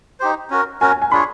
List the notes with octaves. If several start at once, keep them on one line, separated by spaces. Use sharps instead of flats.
D#4 G4 C5
C#4 F#4 A#4
C#4 F#4 A#4 G#5
G#5
G#5
D4 F4 G#4 C#5 B5